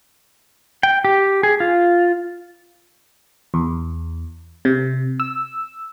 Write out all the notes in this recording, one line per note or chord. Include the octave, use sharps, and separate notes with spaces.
G5
G4
G#4
F4
E2
C3
E6